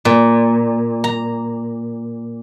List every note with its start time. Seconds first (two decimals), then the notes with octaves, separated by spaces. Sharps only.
0.05 A#2
1.04 A#5